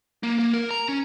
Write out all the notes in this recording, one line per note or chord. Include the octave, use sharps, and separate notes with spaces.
A#3
A#3
A#4
A#5
C#4